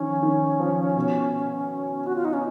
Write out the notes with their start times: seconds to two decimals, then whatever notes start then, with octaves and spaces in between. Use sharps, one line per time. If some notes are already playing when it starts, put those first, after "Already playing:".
Already playing: D#3 F3 C#4
0.22 D#3
0.60 F3
0.96 B2
2.07 F#4
2.16 F4
2.25 D#4
2.33 C#4